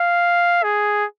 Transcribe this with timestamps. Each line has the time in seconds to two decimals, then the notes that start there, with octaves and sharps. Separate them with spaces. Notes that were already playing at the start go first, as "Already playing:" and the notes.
Already playing: F5
0.64 G#4